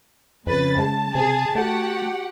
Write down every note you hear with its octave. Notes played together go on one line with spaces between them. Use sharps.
F2 C#3 B4 A6
G#3 A5
C3 G#4
A3 F#4 G4 F#5